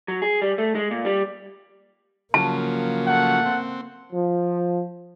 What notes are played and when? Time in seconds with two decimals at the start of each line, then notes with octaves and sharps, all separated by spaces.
0.08 F#3
0.22 G#4
0.42 G3
0.58 A3
0.75 G#3
0.91 A#2
1.05 G3
2.34 C#3 F3 F#3 A#3 A5
3.06 A3 F#5
3.45 C4
4.13 F3